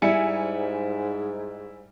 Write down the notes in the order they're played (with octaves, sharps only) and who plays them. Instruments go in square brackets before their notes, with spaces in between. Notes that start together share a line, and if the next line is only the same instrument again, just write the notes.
[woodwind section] G#2 [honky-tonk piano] G3 G#5 C#7 [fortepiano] E4